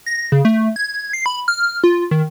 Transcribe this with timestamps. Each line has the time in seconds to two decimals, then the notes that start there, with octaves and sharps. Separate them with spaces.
0.06 A#6
0.32 C#3
0.45 A3
0.76 G#6
1.13 C7
1.26 B5
1.48 F6
1.84 F4
2.11 D#3